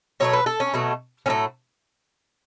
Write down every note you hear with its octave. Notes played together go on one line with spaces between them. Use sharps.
B2 F#3 A3 C#5
B4
A4
C#4
B2 F#3 A3
A2 F#3 A3 C#4